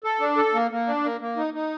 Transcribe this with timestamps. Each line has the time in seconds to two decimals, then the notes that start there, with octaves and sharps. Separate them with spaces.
0.04 A4
0.20 D4
0.37 A4
0.54 A#3
0.71 A#3
0.87 D4
1.04 A#3
1.21 A#3
1.37 D#4
1.54 D#4